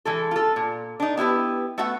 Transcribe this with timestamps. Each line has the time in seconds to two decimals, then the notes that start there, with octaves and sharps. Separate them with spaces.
0.05 E3 G#3 A4
0.31 F4 A4
0.56 A#2
1.00 D4 D#4
1.17 B3 E4 G4 B4
1.78 A3 B3 F#4 B4 E5 F#5